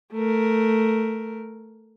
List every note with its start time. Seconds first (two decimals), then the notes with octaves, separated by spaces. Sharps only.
0.13 A3 A#4